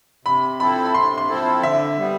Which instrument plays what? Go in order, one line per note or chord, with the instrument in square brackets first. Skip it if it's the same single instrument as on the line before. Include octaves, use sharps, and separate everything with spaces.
[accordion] C3 [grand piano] B5
[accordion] F3 C4 E4 A4 [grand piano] B5
[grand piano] B5
[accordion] C3 [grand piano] C6
[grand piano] C6
[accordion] F3 C4 E4 A4
[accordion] D3 [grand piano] E5
[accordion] G3 B3